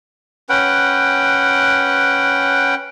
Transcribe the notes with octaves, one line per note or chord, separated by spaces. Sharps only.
C#4 B4 F#5 G5